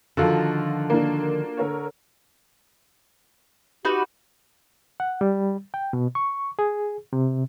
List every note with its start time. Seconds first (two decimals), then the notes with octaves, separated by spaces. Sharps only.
0.17 D3 D#3 F3 F4 F#4 A4
0.90 A#3 D4
1.57 D3 A#4 C#5
3.85 D#4 F#4 G4 B4
5.00 F#5
5.21 G3
5.74 G5
5.93 B2
6.15 C#6
6.59 G#4
7.13 C3